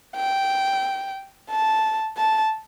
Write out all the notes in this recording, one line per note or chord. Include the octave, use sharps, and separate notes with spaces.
G5
A5
A5